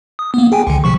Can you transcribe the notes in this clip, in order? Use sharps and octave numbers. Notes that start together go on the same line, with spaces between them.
D#6
A#3 B3
G#4 G5 G#5
C#2 D3
C3 F3 C#6